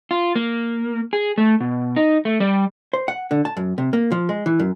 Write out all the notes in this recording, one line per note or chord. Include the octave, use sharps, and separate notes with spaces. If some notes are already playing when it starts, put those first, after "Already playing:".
F4
A#3
G#4
A3
B2
D#4
A3
G3
C5
F#5
D3
A5
F#2
C3
A#3
F3
G#3
E3
F#2